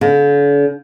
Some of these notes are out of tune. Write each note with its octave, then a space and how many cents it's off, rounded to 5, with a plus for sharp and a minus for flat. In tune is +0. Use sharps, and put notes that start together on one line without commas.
D3 -45